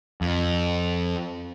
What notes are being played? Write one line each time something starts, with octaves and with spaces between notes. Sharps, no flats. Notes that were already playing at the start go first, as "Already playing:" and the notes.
F2